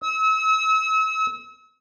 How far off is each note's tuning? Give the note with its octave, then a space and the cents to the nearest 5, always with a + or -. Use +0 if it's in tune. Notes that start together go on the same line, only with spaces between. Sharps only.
E6 -40